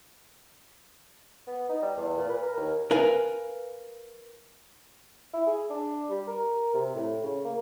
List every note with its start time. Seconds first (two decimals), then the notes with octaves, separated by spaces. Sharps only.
1.47 B3
1.69 D#4
1.82 G3
1.97 E2
2.18 A#2
2.29 B4
2.43 A#4
2.57 D#2
2.91 A#4 B4 F5 G#5
5.34 E4
5.47 G#4
5.70 D4
6.10 G3
6.28 A#4
6.74 C3
6.95 A2
7.23 C#3
7.45 A#3